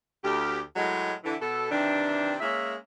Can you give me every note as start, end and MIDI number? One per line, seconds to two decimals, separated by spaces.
0.23 0.59 38
0.23 0.59 67
0.76 1.12 45
0.76 1.12 54
0.76 1.12 56
1.24 1.35 50
1.24 1.35 52
1.41 1.69 47
1.41 1.69 69
1.71 2.34 48
1.71 2.34 51
1.71 2.34 52
1.71 2.34 62
2.41 2.74 56
2.41 2.74 58
2.41 2.74 61
2.41 2.74 76